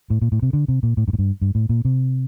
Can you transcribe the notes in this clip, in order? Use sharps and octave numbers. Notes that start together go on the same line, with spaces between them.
A2
A#2
A2
C3
D3
C3
A#2
A2
G2
A2
G2
G2
A2
A#2
C3